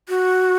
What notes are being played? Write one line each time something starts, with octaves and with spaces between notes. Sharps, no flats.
F#4